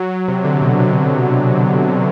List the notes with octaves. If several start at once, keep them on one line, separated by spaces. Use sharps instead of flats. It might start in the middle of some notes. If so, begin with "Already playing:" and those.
Already playing: F#3
F#3
C3
D3
B2
C3